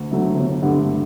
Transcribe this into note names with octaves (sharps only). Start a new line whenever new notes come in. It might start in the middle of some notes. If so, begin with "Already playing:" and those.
Already playing: D2
D3 F#3 A3
G1
G2 D3 A3